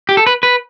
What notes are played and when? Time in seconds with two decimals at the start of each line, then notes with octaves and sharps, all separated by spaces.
0.09 G4
0.17 A4
0.27 B4
0.43 B4